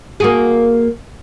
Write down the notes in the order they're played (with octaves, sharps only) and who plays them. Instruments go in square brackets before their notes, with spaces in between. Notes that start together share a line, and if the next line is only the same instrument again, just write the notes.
[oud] A#3 F#4 G#4